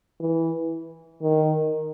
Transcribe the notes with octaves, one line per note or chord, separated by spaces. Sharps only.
E3
D#3